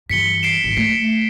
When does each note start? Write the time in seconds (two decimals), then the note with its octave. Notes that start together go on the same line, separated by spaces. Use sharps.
0.10 G2 E3 B6 C#7 G7
0.43 C7 D7 E7
0.64 G#1 E3
0.77 A3 B6